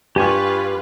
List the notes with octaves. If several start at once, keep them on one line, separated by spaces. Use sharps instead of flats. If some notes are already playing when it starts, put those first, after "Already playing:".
G2 F4 G4 B4 G#5 C#6